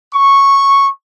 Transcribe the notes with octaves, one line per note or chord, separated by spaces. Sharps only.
C#6